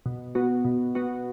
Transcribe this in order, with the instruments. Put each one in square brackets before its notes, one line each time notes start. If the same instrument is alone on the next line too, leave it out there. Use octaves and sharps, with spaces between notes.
[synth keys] B2
B3 F#4
B2
B3 F#4